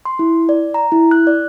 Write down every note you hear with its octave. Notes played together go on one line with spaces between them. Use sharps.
C6
E4
D5
A#5
E4
F#6
D5